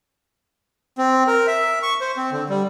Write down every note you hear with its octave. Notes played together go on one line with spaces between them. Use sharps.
C4
A#4
E5
C#6
C5
C4
D3
G3